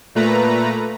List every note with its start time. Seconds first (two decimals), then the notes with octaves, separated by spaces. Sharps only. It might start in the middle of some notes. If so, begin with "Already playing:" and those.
0.15 A#2 A3 B4 A#5